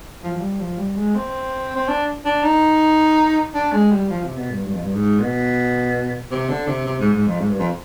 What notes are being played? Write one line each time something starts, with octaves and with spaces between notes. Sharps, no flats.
F3
F3
G3
F3
G3
G#3
C4
C4
D4
D4
D#4
D4
G#3
G3
F3
C3
B2
G2
G2
F2
G2
G#2
B2
C3
D3
C3
C3
G#2
G#2
F2
G#2
G2
F2